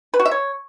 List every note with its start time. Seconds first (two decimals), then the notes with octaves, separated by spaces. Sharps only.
0.14 B4
0.20 F#4
0.26 E5
0.31 C#5